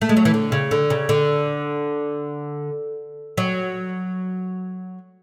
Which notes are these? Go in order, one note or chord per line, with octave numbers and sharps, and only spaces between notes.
A3
G#3
F#3
E3
D3
C#3
D3
C#3
D3
F#3